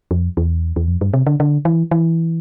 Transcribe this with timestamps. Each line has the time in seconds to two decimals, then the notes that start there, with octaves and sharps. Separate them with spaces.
0.11 F2
0.37 E2
0.76 E2
0.88 F2
1.01 G2
1.14 C3
1.27 D3
1.40 D3
1.65 E3
1.91 E3